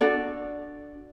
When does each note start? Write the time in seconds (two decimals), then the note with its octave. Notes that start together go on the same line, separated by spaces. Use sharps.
0.01 D4 F#4 A4 D5